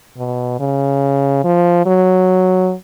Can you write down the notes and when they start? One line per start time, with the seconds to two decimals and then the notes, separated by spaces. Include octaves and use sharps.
0.17 B2
0.60 C#3
1.44 F3
1.86 F#3